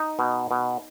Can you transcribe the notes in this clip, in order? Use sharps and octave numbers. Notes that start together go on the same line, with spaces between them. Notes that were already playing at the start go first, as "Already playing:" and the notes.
Already playing: D#4
B2
B2